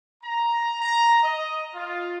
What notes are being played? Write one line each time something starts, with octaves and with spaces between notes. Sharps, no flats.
A#5
A#5
D#5
F4